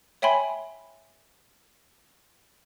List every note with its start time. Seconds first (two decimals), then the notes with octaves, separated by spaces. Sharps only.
0.22 C#5 E5 G5 G#5 B5 C6